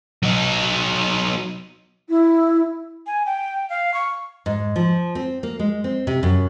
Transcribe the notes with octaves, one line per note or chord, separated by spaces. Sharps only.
F#3 D#4
E4
G#5
G5
F5
C#6
G#2
F3
C4
A#3
G#3
C4
C3
F#2